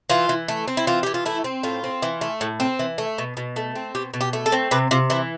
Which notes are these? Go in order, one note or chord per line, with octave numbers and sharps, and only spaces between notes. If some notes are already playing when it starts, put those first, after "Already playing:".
E3 F4
E3
A3
C4
E4
E3 F4
E3 G4
F4
A3 E4
C4
A2 F4
C4
E3
A3
A2
C4
E3
A3
B2
B2
A3
C4
B2 G4
B2
G4
A3
A4
C4
C3 B4
C3 F4
E3 E4